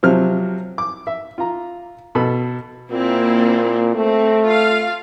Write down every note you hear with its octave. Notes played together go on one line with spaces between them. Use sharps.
C3 F3 F#3 F6
D6
E5
F4 A#5
B2 A4 B5
A#2 A#3 C4 E4
A3 C4
F4 F5